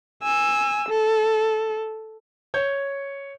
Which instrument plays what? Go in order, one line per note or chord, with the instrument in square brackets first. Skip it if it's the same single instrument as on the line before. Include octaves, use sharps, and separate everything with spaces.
[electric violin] G#5 E6
A4
[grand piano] C#5 G6